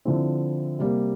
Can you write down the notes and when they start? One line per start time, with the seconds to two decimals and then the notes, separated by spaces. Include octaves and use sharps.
0.05 D3 F3 C4 E4
0.79 C3 G3 A#3